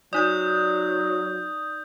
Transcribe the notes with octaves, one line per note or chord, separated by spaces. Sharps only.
F#3 D#4 D5 D#6 G6